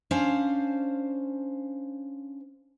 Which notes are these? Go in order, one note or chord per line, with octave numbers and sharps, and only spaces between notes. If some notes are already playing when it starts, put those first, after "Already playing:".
C#4 D4 C5 F5